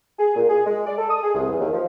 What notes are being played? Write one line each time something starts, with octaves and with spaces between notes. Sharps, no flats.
G#4
A#2
G#4
G#3
D5
A4
D#6
G#4
C2
E2
D#2
F3